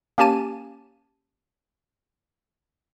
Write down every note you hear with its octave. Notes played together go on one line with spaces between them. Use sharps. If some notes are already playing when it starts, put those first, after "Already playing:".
A#3 C#4 G4 G#5 A5 D#7